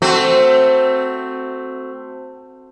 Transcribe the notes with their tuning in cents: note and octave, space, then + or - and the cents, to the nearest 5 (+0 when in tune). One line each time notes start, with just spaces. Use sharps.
A3 +15 C4 +0 F#4 +0